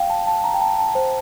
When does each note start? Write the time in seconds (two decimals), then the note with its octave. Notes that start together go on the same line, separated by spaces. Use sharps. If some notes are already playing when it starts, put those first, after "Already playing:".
Already playing: F5 G5
0.10 A5
0.27 A5
0.44 A#5
0.54 G5
0.61 A5
0.79 A5
0.95 C5